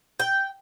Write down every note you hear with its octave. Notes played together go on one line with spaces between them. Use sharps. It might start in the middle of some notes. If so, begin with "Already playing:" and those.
G5